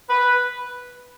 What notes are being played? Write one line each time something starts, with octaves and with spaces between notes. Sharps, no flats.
B4